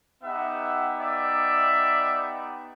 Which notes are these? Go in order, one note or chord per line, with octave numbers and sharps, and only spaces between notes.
B3 D#4 G4 E5 F#5
D5 E5